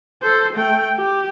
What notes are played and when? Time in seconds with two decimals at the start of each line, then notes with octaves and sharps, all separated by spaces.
0.22 A4 C5
0.53 A3 G5
0.96 G4